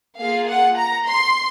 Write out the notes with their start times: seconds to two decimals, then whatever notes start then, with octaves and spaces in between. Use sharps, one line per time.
0.18 A#3 F4 G#4 F5
0.47 F#5
0.76 A#5
1.04 C6